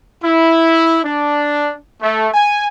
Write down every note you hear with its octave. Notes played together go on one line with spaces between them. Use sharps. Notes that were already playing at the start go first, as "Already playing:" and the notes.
E4
D4
A3
G#5